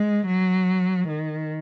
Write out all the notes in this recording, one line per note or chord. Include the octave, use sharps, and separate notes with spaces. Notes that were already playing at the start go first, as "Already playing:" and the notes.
Already playing: G#3
F#3
D#3